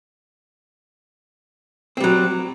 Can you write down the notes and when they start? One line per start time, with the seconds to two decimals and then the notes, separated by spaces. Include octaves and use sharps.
1.97 C4
2.00 G3
2.04 F#3